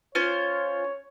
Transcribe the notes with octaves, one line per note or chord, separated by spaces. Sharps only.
C#4 F4 C5 C#5